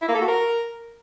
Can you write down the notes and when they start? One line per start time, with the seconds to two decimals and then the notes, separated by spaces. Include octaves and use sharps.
0.02 E4
0.08 A#3
0.15 A4
0.21 F#4
0.28 A#4